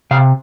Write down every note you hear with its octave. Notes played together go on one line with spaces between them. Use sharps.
C3 F5